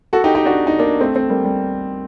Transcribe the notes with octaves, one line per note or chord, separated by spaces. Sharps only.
F#4 A4
D#4 G4
D#4 G4
D4 F#4
D#4
A#3 D4
A3 C4
A3 C4
G3 A#3
G3